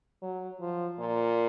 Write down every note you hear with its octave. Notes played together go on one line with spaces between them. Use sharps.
F#3
F3
A#2